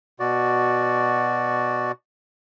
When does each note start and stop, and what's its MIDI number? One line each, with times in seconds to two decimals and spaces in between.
0.20 1.92 47
0.20 1.92 66
0.20 1.92 74